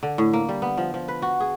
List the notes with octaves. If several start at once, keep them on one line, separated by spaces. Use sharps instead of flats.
D3
A2
A#3
G3
B3
F3
F3
B4
F#4
G#4